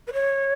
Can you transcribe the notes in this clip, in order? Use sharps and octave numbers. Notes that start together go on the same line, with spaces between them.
B4
C#5